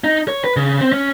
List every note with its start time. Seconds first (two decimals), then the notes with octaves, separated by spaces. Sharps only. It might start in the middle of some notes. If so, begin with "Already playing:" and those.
0.04 D#4
0.28 C#5
0.44 B4
0.56 C#3
0.81 C4
0.92 C#4